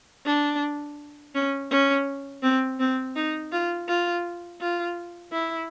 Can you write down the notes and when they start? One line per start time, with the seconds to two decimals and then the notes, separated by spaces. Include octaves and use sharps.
0.26 D4
1.34 C#4
1.71 C#4
2.43 C4
2.79 C4
3.16 D#4
3.52 F4
3.88 F4
4.61 F4
5.33 E4